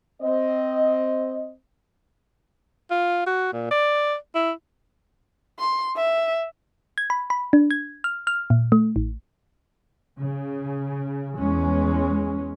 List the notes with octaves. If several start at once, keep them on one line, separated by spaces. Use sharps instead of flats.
C4 D#5
F4
F#4
A#2
D5
E4
C6
E5
G#6
B5
B5
D4
G#6
F6
F6
A#2
A3
A1
C#3
E2 G#3 C#4